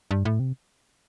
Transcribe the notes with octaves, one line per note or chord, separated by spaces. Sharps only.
G2
A2
C3